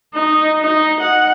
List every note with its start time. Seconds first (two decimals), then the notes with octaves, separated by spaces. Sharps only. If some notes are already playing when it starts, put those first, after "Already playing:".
0.14 D#4
0.61 D#4
1.00 F#5